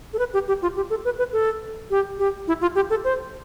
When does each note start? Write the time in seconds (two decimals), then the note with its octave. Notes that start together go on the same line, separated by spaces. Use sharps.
0.13 A4
0.19 B4
0.33 G4
0.48 G4
0.62 F4
0.76 G4
0.90 A4
1.05 B4
1.19 B4
1.33 A4
1.90 G4
2.19 G4
2.48 E4
2.62 F4
2.75 G4
2.90 A4
3.04 C5